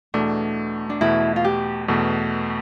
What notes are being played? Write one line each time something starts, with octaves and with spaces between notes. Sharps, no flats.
E2 B2 A3 D4
D4
E2 B2 A3 E4
F4
G4
E2 B2 A3